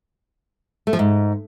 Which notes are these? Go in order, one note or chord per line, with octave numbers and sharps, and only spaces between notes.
A3
F3
G#2